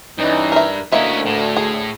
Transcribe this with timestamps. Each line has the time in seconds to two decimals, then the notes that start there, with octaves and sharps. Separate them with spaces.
0.18 G2 E3 C#4 D#4
0.52 A#4 E5
0.92 D2 A#3 C#4 E4 D#5 E5
1.26 A2
1.57 G#4